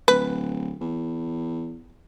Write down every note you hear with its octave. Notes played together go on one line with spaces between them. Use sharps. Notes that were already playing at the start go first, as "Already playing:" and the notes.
D1 B4
E2